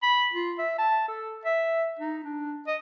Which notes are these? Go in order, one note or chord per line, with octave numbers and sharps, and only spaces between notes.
B5
F4
E5
A5
A4
E5
D#4
D4
D#5